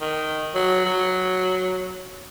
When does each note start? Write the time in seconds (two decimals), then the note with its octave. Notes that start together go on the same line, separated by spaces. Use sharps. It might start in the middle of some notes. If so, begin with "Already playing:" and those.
0.01 D#3
0.55 F#3
0.85 F#3